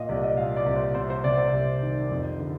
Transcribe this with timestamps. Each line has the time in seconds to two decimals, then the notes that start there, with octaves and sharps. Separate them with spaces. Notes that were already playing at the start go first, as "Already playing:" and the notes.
Already playing: A#2 D#5 F5
0.09 C2 D5
0.23 D#5
0.37 A#2 F5
0.56 D5
0.66 C2
0.76 C5
0.95 C3 C5
1.10 C5
1.24 C3 D5
1.38 C5
1.53 C2
1.82 D#3
2.11 F2
2.39 D3